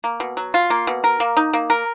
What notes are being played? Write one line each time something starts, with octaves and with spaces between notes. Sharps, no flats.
A#3
B2
F#3
F4
A#3
B2
A#4
A#3
D#4
A#3
A#4